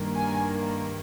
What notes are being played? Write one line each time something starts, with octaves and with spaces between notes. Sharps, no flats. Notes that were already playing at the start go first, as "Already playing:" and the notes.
Already playing: G2 D#3 A#3
G#5